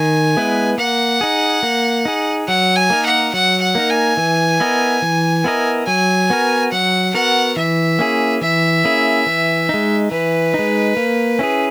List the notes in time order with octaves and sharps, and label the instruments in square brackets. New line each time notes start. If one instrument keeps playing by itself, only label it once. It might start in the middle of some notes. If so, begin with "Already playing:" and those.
Already playing: [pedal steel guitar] D#3 [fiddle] G#5
[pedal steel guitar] G#3 B3 E4 B4
[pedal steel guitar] A#3 [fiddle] F#5
[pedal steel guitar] D#4 G#4
A#3
D#4 G#4
[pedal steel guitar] F#3 [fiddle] F#5
[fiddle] G#5
[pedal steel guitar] A#3 D#4 A#4
[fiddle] F#5
[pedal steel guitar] F#3 [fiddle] F#5
[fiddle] F#5
[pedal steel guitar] A#3 D#4 A#4
[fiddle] G#5
[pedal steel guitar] E3
B3 E4 A#4 D#5
E3
B3 E4 A#4 D#5
[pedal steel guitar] F#3 [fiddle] G#5
[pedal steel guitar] B3 F#4 A#4
[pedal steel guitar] F#3 [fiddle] F#5
[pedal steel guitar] B3 F#4 A#4 [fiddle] F#5
[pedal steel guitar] E3 [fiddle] E5
[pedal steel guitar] A#3 C#4 E4 G#4
[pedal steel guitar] E3 [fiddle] E5
[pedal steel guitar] A#3 C#4 E4 G#4
E3
G#3 D#4
[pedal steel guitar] E3 [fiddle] B4
[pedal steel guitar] D#4
G#3
A#3
C#4 E4 G#4